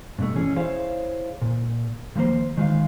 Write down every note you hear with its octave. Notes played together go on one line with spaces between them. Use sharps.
G2 B2 A3
E3 C#4 G#4
E4 G#4 C5 C#5 F5
A#2
D#2 F3 F#3 A#3 C5
D#3 G#3 F4 F5